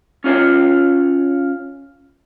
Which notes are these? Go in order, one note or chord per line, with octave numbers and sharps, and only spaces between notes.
C#4 F4 C#5 F5